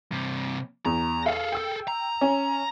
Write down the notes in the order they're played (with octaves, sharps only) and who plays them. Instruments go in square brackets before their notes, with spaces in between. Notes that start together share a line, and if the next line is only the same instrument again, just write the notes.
[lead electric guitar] G2 C3
[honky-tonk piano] E2 [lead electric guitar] A#5
[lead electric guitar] G#4 A4 [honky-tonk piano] F5
[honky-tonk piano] G5 E6
[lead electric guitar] A#5
[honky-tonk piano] C#4